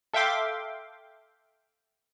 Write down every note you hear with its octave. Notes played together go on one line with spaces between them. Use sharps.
A4 E5 F5 G5 C6 D6